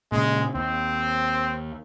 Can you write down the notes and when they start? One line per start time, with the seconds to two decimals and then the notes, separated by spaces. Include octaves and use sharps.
0.12 A#2 C#3 G#3
0.55 D#2 C4